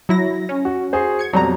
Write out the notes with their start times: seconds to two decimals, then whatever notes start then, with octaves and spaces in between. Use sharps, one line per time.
0.09 F#3 E4 A#6
0.49 C#4
0.65 F#4
0.93 F#4 G#4 C5
1.19 G#6 C#7
1.33 F2 B2 F#3 G3 A#5